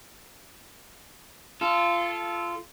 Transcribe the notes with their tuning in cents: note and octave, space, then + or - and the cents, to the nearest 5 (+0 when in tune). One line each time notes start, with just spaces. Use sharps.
F4 -20 A4 -10